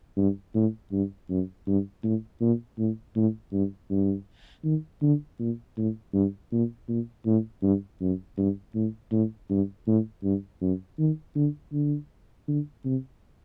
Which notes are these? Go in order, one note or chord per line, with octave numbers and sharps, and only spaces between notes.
G2
A2
G2
F#2
G2
A2
A#2
A2
A2
G2
G2
D#3
D3
A#2
A2
G2
A#2
A#2
A2
G2
F#2
G2
A2
A2
G2
A2
G2
F#2
D#3
D3
D3
D3
C3